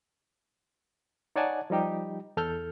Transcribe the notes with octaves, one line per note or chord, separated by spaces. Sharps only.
D#4 C#5 D5 F#5 G#5 A5
F3 G3 D#4 G4
E2 A4 F6 G6